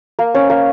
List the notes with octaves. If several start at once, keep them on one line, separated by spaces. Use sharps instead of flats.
A#3
C#4
A#3